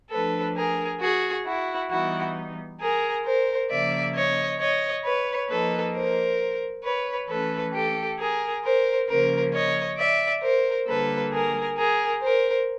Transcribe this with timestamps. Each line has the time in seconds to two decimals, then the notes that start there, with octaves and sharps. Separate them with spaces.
0.11 F3 A3 D4 A4 B4
0.55 G#4 A#4
1.01 F#4 G#4
1.46 E4 F#4
1.90 E3 G3 B3 D#4 E4 F#4
2.80 G#4 A#4
3.25 A#4 C5
3.70 C#3 F3 A#3 D5 E5
4.14 C#5 D#5
4.59 C#5 D#5
5.04 B4 C#5
5.49 F3 A#3 D#4 A4 B4
5.94 A#4 C5
6.84 B4 C#5
7.29 E3 A3 C#4 A4 B4
7.74 G4 A4
8.19 G#4 A#4
8.63 A#4 C5
9.08 C#3 F3 A#3 C#4 A#4 C5
9.53 C#5 D#5
9.98 D5 E5
10.42 A#4 C5
10.88 D3 G3 A#3 A4 B4
11.32 G#4 A#4
11.78 G#4 A#4
12.22 A#4 C5